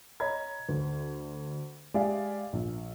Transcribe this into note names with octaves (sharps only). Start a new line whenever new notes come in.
C#5 D#5 A#5 B5 G#6
D2
G#3 G4 D5 E5 F5 G#5
A#1